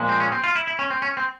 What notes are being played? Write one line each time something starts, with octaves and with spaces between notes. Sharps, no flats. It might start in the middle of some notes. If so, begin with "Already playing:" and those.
Already playing: A#2 F3 G#3
C4
C#4
C4
F4
E4
E4
C#4
C4
C#4
C4